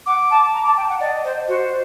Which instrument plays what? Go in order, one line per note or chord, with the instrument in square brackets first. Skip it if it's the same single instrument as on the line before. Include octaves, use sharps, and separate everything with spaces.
[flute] F#5 [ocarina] D6
[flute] A5
A#5
A5
G5
F#5
[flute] D5 [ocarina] D#5
[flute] C5
[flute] F#4 [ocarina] C5